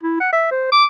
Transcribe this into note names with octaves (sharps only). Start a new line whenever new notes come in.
E4
F#5
E5
C5
D6